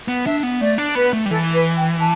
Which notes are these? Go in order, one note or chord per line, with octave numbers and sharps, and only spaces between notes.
B3
D4 E5
B3
A3 D5
D4
B3 B4
A3
G3
E3 A4
B4
G5
A5